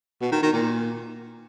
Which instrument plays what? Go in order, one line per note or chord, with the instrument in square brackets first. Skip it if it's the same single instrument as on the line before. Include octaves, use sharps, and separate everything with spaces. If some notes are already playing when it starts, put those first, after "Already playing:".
[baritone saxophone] B2
D#3
D#3
A#2